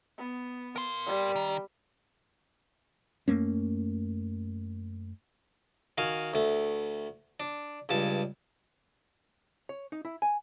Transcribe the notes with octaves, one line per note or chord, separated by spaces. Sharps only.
B3
A#4 C6
G3
D#3
F#2 A3 A#3 C#4
D#3 F#4 F5 G#5
D2 A3
D4
C#2 G2 A5
C#5
D#4
E4
G#5